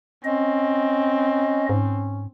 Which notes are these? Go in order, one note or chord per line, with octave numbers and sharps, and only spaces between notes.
C4 C#4 D#5
G#2